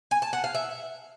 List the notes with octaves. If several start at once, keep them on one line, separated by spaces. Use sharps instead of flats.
G#5
A5
F#5
F5
E5